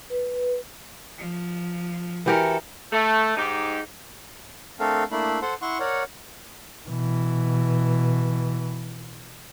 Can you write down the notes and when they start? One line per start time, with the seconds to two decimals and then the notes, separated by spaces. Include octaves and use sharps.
0.10 B4
1.17 F3
2.26 E3 F#4 G4 A4 A#4
2.92 A3
3.37 G#2 D#4 G4
4.80 A3 C4 D4 A4 A#4 F5
5.12 A3 A#3 D4 E4 B5
5.42 A4 C5 F#5 C6
5.62 E4 F#5 C6 C#6
5.80 A#4 C#5 D5 F#5
6.89 B2 E3